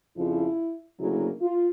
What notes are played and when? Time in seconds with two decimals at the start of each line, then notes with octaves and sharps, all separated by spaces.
0.17 F2 C#3 F3 E4
0.99 D2 C#3 F#3 A#3 E4
1.41 F4